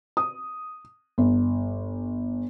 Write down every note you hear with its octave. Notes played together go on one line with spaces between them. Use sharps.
D#6
G1